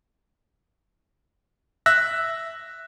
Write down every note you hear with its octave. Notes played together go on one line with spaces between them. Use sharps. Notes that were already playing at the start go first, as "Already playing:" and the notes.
E5 E6 F#6 A#6